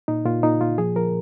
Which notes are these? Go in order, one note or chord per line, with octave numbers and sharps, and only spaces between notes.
A#2 D#4
A#2 F4
A#2 D#4
A#2 F4
F3 G#4
F3 A#4